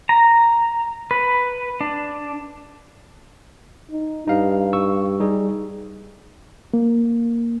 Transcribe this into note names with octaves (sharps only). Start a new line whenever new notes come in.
A#5
B4
D4
D#4
G2 D#4 F5
C#6 E6
G3 D#4 G#4
A#3